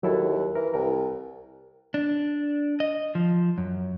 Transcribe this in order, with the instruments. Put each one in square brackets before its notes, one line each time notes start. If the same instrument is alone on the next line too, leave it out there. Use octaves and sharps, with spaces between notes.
[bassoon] D#2 [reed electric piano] F#3 E4 A4
[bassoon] E3 [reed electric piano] A#4
[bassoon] C2 [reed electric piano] A#4
[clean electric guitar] D4
D#5
F3
F#2